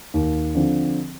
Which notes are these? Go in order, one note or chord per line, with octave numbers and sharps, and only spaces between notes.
D#2
D3 F3 C4